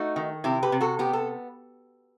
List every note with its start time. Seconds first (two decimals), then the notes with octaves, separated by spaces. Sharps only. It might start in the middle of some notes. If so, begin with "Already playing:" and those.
Already playing: A3 D#4 F#4
0.16 D#3
0.44 C3 E4 G4
0.63 G4 B4
0.72 C3
0.81 F#4 A4
0.99 B3 G4
1.13 A4